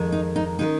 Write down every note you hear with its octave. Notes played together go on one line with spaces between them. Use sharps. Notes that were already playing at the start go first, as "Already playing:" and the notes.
Already playing: F2 D#3 G#3
D#4
D#4
D#3 G#3 C#4 D#4